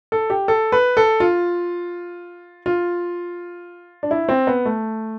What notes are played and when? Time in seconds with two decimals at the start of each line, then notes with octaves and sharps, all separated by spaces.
0.12 A4
0.30 G4
0.48 A4
0.72 B4
0.97 A4
1.20 F4
2.66 F4
4.03 D4
4.11 E4
4.29 C4
4.47 B3
4.65 A3